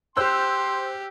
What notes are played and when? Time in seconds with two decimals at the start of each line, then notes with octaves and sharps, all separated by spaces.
0.17 G4 C5 C6 E6 F#6